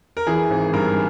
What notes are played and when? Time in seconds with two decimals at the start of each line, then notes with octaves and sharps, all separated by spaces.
0.17 A#4
0.27 E3 G#4
0.50 G#1
0.73 G2 A#4